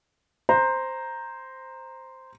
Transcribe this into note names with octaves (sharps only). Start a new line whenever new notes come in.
C5 A#5